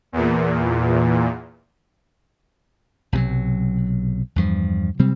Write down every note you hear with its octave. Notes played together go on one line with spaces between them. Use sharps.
E2 A#2
B1 C3 F3 F#3
E2 G2 F3
C3 F#3 G3 C4